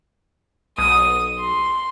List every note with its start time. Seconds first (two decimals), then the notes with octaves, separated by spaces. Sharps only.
0.78 B1 D#6
1.39 C6